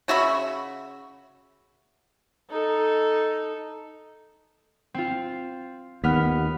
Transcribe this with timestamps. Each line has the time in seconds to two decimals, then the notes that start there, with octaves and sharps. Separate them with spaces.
0.08 C#3 F#4 E5 B5
2.50 D#4 A4
4.94 C4 F4
6.04 D#2 B3 F6 B6